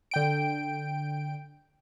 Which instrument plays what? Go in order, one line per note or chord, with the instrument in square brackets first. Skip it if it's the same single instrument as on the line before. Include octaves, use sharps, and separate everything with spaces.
[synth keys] D3 G5 D7